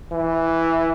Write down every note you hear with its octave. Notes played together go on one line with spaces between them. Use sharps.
E3